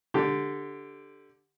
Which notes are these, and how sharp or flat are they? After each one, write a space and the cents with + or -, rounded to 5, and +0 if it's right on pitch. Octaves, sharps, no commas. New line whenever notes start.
D3 +0 G4 +0